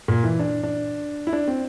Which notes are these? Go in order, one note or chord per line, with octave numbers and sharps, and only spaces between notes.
A#2
E3
D4
D4
E4
D4
C4